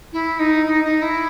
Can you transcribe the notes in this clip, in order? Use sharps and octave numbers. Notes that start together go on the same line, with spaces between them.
E4
D#4
D#4
D#4
E4